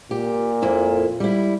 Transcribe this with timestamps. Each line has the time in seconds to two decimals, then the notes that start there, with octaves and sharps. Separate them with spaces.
0.11 A#2 G4
0.62 F2 A#3 E4
1.20 G3 E4